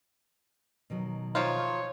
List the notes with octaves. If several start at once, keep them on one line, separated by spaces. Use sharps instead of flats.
B2 D#3 F#3
F3 D#4 F4 C#5